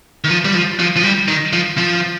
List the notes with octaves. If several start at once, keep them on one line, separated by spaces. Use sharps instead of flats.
D#3
F3
G3
F3
F3
F3
G3
D#3
F3
F3